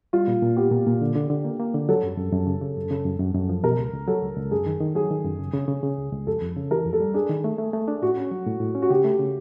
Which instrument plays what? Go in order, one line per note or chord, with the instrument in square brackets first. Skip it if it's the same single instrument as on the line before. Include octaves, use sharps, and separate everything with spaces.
[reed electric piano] G3 [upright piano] F4
[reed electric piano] A#2
A#2
[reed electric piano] B3 [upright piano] G4
[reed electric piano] A#2
A#2
D3
D3
D3
A#3
A#3
D3
[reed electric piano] F#3 [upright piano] A4
[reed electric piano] F#2
F#2
F#2
C#3
C#3
F#2
C#3
F#2
F#2
F#2
F3
[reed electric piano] B2 [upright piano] A#4
[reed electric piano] C#2
C#2
[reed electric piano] F#3 [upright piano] A4
[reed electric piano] C#2
C#2
[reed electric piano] F#2 [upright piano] G#4
[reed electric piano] D#3
D#3
[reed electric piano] F#3 [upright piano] G#4
[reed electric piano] D#3
F#2
C#3
C#3
C#3
C#3
C#2
C#2
[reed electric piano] F2 [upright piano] A4
[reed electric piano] F2
C#3
[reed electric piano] E3 [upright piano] A#4
[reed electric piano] F2
[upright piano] A4
[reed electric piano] G3
[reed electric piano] D4 [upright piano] G#4
[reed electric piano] D#3
A3
A3
A3
D4
[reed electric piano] A2 [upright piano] F#4
[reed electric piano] C#4
F#3
A2
A2
C#4
[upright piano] F#4
[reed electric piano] C#3 [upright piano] G4
[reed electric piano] A3
C#3